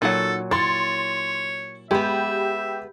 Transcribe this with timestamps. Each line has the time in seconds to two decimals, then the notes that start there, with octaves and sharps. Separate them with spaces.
0.02 A#2 F#3 D#4 F#4 A4 F#5
0.51 E4 C#5 C6 A6
1.91 G#3 B3 G4 E5 B5